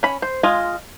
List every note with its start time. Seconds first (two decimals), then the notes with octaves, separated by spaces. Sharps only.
0.03 C#4 B5
0.22 C5
0.43 G#3 F4 D#5